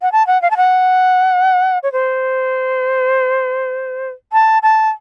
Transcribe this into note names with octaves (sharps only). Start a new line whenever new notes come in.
F#5
A5
F#5
F5
A5
F#5
C#5
C5
A5
A5